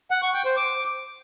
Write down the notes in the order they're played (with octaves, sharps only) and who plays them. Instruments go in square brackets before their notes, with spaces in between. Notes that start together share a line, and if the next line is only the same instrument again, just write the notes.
[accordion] F#5
C#6
G5
C5
D6